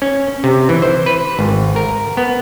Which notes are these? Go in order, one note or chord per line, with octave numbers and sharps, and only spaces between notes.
C#4
C3
E3
C5
B4
G#1
A#4
B3